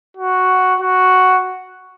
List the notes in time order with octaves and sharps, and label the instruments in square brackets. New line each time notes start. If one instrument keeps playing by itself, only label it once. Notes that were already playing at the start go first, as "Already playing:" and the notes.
[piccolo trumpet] F#4
F#4